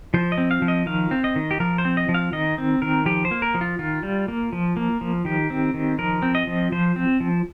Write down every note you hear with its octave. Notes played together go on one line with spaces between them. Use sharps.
F3 C5
D#5
C4
F5
F3
D#5
D#3 F5
C4
D#5
D#3
G4
F3 A#4
C5
C4
D#5
F3
F5
D#3 D#5
C4
D#3 A#4
F3 G4
C5
A#3
A#4
F3
F4
D#3 F4
G3
A#3
F3
A#3
F3
D#3 G4
C4
D#3
F3 A#4
C4
D#5
F3
F3 C5
C4
F3